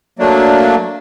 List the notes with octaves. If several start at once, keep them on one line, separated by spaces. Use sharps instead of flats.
F#3 A3 A#3 D4